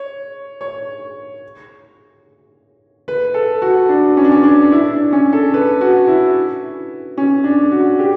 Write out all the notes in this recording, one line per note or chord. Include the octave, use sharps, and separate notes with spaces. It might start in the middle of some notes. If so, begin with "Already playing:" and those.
Already playing: C#5
C#5
B4
A4
F#4
D4
C#4
D4
C#4
D4
E4
D4
C#4
A4
B4
F#4
E4
C#4
D4
F#4
G4